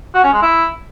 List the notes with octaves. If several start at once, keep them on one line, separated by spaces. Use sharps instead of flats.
F#4
C#4
G#3
E4